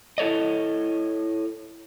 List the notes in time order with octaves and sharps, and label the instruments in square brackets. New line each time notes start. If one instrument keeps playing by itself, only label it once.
[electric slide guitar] E4 A4 C#5 D#5